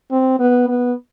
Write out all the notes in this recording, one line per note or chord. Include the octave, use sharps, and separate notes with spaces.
C4
B3
B3